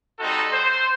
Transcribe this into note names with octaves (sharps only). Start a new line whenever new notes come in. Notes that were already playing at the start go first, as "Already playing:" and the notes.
G3 C4 D#4 F#4 A4
C5